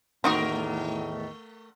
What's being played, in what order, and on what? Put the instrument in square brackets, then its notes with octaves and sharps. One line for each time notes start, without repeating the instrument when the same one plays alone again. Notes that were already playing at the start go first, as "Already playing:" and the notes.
[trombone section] E2 A2 D#3 [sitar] A3 A#4 [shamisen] C4 D#4 F#4